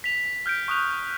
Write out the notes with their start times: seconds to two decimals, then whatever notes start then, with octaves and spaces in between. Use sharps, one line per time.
0.04 B6 F7
0.46 F6 G6 B6 D7
0.68 C#6 D#6 F#6 F7